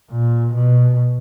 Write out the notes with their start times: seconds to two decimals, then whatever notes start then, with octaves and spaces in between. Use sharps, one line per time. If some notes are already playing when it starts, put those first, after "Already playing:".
0.11 A#2
0.55 B2